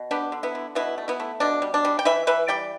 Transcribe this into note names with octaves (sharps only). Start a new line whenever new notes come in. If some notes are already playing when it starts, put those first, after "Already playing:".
Already playing: B2
B3 D4 G4
D3
B3 E4
D3
B2 B3 E4
A3
B3 E4
A3
B2 D4
G3
D4
G3
G5
E3 B4 E5
E3 B4 E5
G3 D5 G5